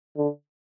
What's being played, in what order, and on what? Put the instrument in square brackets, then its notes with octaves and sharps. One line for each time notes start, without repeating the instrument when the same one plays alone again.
[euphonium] D3